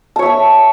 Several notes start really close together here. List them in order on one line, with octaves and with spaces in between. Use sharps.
A5 C#5 E5 C#6